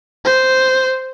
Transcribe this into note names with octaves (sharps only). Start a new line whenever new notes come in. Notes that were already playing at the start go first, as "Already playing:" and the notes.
C5